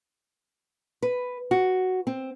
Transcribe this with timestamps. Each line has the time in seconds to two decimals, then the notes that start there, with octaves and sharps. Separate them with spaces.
1.02 B4
1.51 F#4
2.07 C4